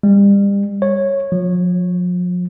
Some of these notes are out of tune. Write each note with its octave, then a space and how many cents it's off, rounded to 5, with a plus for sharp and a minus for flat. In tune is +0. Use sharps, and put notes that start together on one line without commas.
G3 +35
C#5 -10
F3 +40